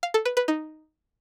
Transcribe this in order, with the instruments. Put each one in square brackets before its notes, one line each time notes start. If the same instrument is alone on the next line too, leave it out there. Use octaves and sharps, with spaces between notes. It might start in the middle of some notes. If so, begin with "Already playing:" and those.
[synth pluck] F5
A4
B4
B4
D#4